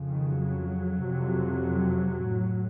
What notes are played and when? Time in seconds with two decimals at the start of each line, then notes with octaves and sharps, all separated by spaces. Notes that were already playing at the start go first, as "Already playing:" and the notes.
Already playing: F2 C#3
0.11 D#3
0.42 F#3
1.04 F2 C3
2.26 A2